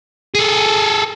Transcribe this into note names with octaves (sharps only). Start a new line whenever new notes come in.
G#4 A4